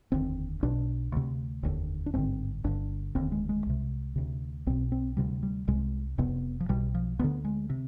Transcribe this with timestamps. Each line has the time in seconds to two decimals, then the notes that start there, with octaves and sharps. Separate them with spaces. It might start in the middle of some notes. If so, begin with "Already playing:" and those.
0.12 F1 D#2 D3 C4
0.63 B1 B2 D4
1.12 D2 C3
1.63 F1 D#2 D3
2.06 D4
2.14 G#1 G2 D3 C4
2.64 G1 G2 D3 D4
3.15 F1 D#2 D3 C4
3.32 G#3
3.49 G#3
3.66 C2 C3
4.16 D2 C3
4.66 B1 B2 C4
4.92 C4
5.17 D2 C3 G3
5.43 G3
5.68 C2 C3 G#3
6.18 F1 F2 C3 B3
6.60 F3
6.69 B1 B2 G3
6.95 F3
7.19 D2 D3 B3
7.45 G#3
7.70 C3